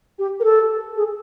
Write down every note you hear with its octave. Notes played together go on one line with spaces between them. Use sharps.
G4
A#4
A4
G#4